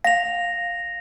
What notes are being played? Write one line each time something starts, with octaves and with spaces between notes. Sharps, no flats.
F5 A#6 F7